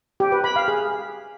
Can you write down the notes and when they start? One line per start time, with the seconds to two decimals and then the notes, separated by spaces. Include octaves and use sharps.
0.20 G4
0.32 B4
0.44 B5
0.56 F5
0.68 G#4